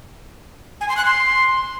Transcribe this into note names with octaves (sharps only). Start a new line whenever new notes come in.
G#5
C6
F#6
C6